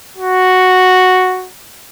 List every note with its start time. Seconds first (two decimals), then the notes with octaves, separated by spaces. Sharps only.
0.17 F#4